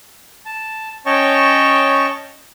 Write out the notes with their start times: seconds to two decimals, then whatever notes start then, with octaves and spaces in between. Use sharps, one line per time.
0.45 A5
1.06 C#4 C#5 D#5 G5 A5 C#6